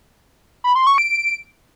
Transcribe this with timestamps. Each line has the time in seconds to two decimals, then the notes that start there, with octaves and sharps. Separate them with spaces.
0.64 B5
0.75 C6
0.87 C#6
0.98 D7